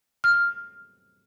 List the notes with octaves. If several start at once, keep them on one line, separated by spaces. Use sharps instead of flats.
F6